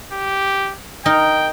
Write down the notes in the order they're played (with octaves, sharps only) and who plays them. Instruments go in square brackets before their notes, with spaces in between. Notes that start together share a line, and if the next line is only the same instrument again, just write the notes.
[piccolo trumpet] G4
[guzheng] D#4 A#4 [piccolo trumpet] G5